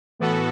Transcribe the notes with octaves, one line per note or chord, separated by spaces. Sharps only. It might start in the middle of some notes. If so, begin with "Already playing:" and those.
A2 E3 B3 F#4 A4